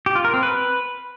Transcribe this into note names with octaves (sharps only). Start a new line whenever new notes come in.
G4
F4
A#4
C4
B4